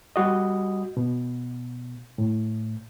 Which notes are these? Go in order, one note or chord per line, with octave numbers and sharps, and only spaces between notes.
G3 F#4 D#5
B2
A2